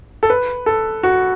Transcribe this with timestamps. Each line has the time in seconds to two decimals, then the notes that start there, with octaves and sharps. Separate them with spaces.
0.23 A4
0.30 B4
0.66 A4
1.03 F#4